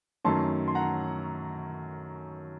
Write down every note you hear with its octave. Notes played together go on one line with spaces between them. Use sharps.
F#2 D#3 A3 C#4 A5 C6
C6
F#5 A#5